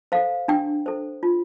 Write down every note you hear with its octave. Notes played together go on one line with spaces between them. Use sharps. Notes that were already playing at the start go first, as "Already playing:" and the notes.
A4 C5 F5
D4 G5
A4 C5
F4